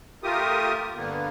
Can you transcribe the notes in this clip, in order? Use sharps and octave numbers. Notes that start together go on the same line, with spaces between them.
A3 F4 G4 A#4 D#6
G2 D3 A#3 B3